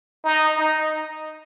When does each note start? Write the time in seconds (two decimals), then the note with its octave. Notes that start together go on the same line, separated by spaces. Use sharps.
0.24 D#4
0.57 D#4